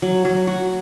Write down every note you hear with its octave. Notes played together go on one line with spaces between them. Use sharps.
F#3
F#3
F#4